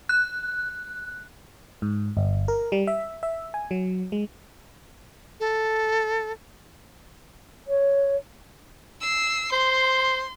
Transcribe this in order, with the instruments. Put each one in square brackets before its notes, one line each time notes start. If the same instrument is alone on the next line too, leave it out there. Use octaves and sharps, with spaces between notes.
[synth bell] F#6
[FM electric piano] G#2
G1
A#4
G3
E5
E5
G#5
F#3
G#3
[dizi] A4
[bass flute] C#5
[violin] E6 C7
[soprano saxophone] C5 [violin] C6